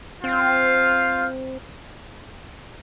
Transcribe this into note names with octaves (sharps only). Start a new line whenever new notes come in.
C4 F4 C5 F5